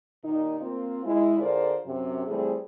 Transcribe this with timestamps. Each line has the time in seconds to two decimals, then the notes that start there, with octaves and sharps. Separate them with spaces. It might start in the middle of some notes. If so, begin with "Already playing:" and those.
0.23 D#2 A#2 D#3 D#4
0.61 A#3 C4 F4
1.05 G#3 E4
1.39 D3 F4 G#4 A#4 C5 D5
1.86 F#2 C3
2.27 E3 G3 A3 C4 G#4